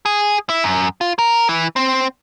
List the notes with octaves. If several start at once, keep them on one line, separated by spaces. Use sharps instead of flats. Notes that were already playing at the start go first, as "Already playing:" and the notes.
G#4
E4
F#2
F4
A#4
E3
C4